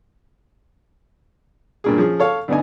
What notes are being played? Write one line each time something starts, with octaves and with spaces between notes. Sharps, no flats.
G2 A#2 G#4
F3 C#4 G#4
A4 C#5 F5
D2 B3 D4 D#4 G#5